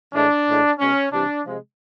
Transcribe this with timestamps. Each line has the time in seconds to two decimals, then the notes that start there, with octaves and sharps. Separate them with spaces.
0.14 A2 E3 G#3 D4
0.47 A2 E3 G#3
0.79 B2 G#3 C#4
1.12 C3 E3 G3 D4
1.45 C3 F3 G#3